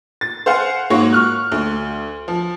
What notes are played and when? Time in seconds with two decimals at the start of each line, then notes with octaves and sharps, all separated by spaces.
0.21 A6
0.46 C5 F5 F#5 G#5
0.90 G#2 A#3 F#4 C#5 C#6
1.13 C#6 F6 F#6
1.52 D2
2.28 F3